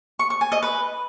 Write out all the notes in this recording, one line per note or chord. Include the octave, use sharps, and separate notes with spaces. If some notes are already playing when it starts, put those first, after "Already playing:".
C#6
C#6
G#5
D#5
B4